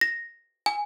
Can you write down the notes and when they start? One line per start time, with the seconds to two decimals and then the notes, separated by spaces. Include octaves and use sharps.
0.01 A#6
0.66 G#5